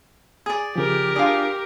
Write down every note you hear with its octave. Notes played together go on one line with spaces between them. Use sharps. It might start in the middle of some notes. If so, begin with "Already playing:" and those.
G#4 D5 G#5
C#3 F3 G4 A#4
D4 F4 G#4 D5